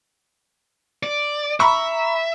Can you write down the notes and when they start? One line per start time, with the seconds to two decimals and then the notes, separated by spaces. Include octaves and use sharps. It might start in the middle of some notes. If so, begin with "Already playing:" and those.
1.03 D5
1.60 E5 A#5 B5 C#6